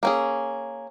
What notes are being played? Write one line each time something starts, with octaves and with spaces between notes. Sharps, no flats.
A#3 C#4 G#4